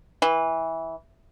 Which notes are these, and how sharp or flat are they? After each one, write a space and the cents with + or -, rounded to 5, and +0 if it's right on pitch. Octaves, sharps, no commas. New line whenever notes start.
E3 -15